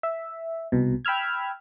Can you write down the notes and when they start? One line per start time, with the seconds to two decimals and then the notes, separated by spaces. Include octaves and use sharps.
0.03 E5
0.72 C2 B2
1.05 G5 B5 E6 F6 G#6